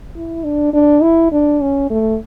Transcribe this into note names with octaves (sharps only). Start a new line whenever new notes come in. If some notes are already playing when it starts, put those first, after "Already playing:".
E4
D4
D4
E4
D4
C#4
A3